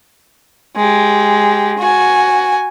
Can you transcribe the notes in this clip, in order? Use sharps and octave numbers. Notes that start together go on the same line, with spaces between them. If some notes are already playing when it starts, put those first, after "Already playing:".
G#3 G4
F#4 G#5